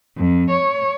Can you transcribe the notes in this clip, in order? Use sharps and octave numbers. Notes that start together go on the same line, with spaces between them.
F2
C#5